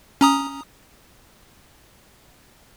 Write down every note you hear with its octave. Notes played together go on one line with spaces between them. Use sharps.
C#4 A#5 D#6